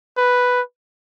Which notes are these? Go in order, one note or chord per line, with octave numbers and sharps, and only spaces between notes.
B4